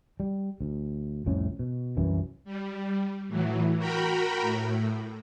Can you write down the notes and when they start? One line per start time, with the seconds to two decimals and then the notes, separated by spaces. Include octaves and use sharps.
0.20 G3
0.61 D2
1.26 C2 F2 A2 C#4
1.59 B2
1.97 C2 F#2 E3
2.45 G3
3.28 A2 E3 F#3
3.78 F#4 A#4 G5 A#5 B5
4.41 A2